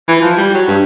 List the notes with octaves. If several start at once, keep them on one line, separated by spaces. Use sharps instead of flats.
E3
F3
G3
F#3
G2